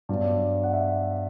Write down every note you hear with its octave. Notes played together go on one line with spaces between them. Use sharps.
G2 F#3 B3 D5
F#5
E5